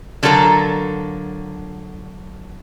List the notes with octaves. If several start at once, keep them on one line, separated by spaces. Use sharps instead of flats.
D3 F#3 F4 A4 A#4 A#5